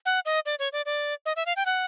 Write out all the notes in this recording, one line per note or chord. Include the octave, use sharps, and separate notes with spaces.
F#5
D#5
D5
C#5
D5
D5
D#5
E5
F5
G5
F#5